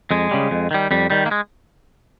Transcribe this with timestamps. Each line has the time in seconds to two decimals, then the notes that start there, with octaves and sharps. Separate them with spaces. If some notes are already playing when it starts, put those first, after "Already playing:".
0.11 F2 G#3
0.31 C#3 G3
0.51 F2
0.71 D#3 G3
0.91 F2 G3
1.10 D#3 G3
1.26 A#3
1.31 G#3